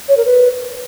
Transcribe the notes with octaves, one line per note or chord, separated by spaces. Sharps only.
C#5
A#4
B4